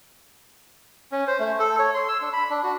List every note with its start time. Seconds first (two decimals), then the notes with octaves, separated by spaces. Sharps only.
1.12 C#4
1.27 C5
1.39 A3
1.59 A4
1.79 C#5
1.95 C6
2.08 E6
2.22 D4
2.33 B5
2.50 D4
2.63 F#4